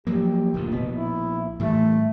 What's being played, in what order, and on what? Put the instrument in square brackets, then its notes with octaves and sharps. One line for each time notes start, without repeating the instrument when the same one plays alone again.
[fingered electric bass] F3 F#3 A#3 [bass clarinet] G4
[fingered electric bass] F#1 D2 A#2
[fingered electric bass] A#1 B3 [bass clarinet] B2
[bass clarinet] E4
[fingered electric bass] A2 E3 G3 [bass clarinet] A3